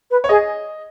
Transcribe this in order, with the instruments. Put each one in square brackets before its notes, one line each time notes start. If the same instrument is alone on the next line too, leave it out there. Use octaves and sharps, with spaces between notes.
[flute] B4
[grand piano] C#5
[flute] G#4 [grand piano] D#5